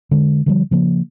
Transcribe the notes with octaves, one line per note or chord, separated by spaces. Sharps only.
D3 G#3
D3 F3 G3
C#3 F3 A#3